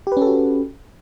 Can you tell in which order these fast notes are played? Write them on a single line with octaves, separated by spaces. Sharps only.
G4 B4 C#4 A4 F#4